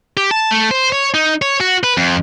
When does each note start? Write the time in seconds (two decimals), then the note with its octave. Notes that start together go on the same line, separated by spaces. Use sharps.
0.17 G4
0.31 A5
0.51 A3
0.71 C5
0.92 C#5
1.14 D#4
1.42 C#5
1.60 F#4
1.83 B4
1.97 F2